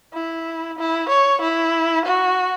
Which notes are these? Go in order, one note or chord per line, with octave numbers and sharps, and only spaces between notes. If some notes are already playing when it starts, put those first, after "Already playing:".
E4
E4
C#5
E4
F#4